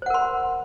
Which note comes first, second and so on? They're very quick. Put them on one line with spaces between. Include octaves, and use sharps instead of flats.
C5 F#5 A#4 C6